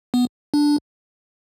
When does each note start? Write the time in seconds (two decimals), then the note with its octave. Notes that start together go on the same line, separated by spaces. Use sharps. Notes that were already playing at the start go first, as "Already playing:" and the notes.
0.14 B3
0.54 D4